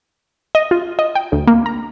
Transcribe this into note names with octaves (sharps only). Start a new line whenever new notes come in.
D#5
F4
D#5
G5
D2
A#3
A#5